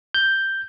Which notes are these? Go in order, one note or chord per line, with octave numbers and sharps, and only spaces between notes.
G6